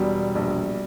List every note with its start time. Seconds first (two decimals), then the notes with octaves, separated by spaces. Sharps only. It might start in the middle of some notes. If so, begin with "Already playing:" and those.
Already playing: E1 B2 G3
0.35 A#1